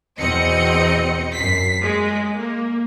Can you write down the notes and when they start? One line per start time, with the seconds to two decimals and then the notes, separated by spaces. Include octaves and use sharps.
0.19 E2 B2 C4 D#5 C#7
1.35 F#2 B6 C7
1.81 G#3
2.38 A#3